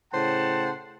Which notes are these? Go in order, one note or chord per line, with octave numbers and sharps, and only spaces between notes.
A2 C#3 C5 F#5 G5 A5